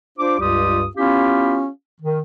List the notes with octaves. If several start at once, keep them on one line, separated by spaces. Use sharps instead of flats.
D4 F4 C5 D6
C#2 G2 G3 F4 G4 D#6
B3 C#4 E4 F4 G4 F5
D#3